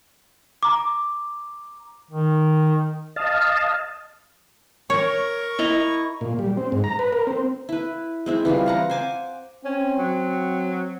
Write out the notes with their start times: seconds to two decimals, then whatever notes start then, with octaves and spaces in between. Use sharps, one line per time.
0.63 A#5 D6
2.11 D#3
3.16 D#5 F5 A5
4.90 A#4 C#5 C#6
5.59 E4 D#5 A#5
6.21 A#2
6.39 G3
6.57 C4
6.72 G#2
6.84 A#5
6.99 B4
7.13 A#4
7.27 C4
7.69 E4 B4
8.26 G#3 C4 E4
8.45 E3 G3 E4 F4
8.66 F5 F#5 A#5
8.89 C5 G#5 D6
9.65 C4 C#4
9.98 F#3